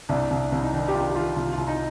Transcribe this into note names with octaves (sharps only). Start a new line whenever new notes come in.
C2 D4
C2
C2
D#4
D#3 D4
G4
D#3 F4
G4
D#3 F4
C2 F4
C2 F4
D#4